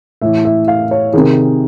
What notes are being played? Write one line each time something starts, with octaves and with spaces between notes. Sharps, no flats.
A2 E3 E5
E5
F5
C#5
C3 D#3 G#4